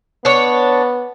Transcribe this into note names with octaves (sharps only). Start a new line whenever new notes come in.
B3 D4 C#5